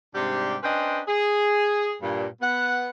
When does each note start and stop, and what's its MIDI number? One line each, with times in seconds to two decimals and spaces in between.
0.14 0.56 44
0.14 0.56 48
0.14 0.56 55
0.14 0.56 62
0.14 0.56 67
0.63 1.00 61
0.63 1.00 62
0.63 1.00 71
0.63 1.00 72
0.63 1.00 75
0.63 1.00 79
1.08 1.94 68
2.02 2.26 43
2.02 2.26 46
2.42 2.90 59
2.42 2.90 78